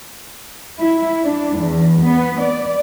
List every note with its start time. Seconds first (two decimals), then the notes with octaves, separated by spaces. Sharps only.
0.80 E4
1.24 D4
1.59 E2
2.04 B3
2.41 D5